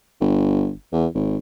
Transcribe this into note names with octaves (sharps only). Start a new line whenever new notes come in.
G1
E2
G#1